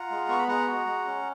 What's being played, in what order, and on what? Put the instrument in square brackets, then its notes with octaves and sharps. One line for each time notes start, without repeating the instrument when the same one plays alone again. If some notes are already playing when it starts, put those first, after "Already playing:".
Already playing: [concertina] F4 F#5 A#5
G#3
B3 C#6
B5
G#3 F#5 A#5
F#4
G#3
C#4